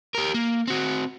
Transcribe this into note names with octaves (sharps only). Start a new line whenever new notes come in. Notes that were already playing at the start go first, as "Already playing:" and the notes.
G4 A#4
A#3
C4 F#4